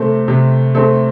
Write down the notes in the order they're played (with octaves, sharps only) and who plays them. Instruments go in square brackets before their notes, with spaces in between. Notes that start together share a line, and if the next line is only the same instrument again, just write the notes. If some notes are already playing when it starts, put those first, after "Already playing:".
Already playing: [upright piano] C3 A3 C4 A4
C3
A3 C4 A4